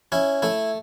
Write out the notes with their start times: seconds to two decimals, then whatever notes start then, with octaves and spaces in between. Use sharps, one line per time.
0.12 C#4 E4
0.42 A3 E4